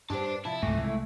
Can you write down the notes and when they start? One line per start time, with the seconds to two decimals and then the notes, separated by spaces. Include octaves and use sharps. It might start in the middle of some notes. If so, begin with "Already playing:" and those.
0.10 G2 D4 G4 C5 D5 A5
0.45 C3 F3 E4 A5
0.63 C#2 G#2 E3 A3
0.75 C2 G#3